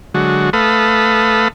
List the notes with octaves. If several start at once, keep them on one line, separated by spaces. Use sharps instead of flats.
D3 F#3 G#3 F#4
A3 A4 B4 F5 B5 D#6